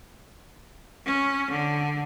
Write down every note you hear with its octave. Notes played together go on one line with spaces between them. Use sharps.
C#4
D3